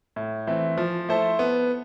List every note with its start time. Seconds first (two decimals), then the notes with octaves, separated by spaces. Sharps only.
0.16 A2
0.47 E3 A3 C4
0.78 F3
1.09 A3 E4 A4 C5
1.39 B3